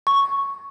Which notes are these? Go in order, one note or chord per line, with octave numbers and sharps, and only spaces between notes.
C#6